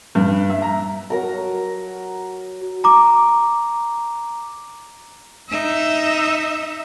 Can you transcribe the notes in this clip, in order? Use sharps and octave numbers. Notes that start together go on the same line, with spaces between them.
G2
E5
A#5
F#3 A#4 A#5
A#5 D6
D#4 E5